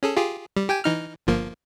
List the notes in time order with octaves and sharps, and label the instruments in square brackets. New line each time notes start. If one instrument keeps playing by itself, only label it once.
[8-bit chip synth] C#4 G#4 A4
F4 G4 G#4
G3
G4 G5 G#5
E3 D#4 F6
G1 F3 A#3